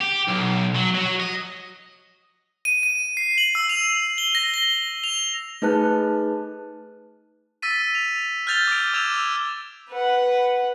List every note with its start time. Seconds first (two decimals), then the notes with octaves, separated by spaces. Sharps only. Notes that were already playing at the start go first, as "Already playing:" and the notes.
0.01 G4
0.28 B1
0.75 F#3
0.95 F#3
1.20 D#5
2.65 D#7
2.83 D#7
3.17 C7
3.38 F#7
3.55 E6
3.69 F7
4.18 G7
4.35 A#6
4.54 G7
5.04 F7
5.62 A3 D#4 G#4 B4 A5 F#6
7.62 E6 A6 B6 D#7
7.95 F7
8.47 F6 G6 A6 F7 G7
8.67 D6 D7
8.94 D6 E6 G#6 E7 F7
9.14 E6
9.90 B4 F#5